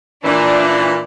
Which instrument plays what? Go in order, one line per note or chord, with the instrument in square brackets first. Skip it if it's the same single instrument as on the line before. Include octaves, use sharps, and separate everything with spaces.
[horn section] A#2 E3 [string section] D4